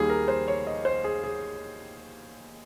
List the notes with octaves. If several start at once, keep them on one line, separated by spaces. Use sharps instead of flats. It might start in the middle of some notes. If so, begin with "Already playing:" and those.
Already playing: D#2 D#3 G3 G#4
A#4
C5
C#5
D#5
C5
G#4
G#4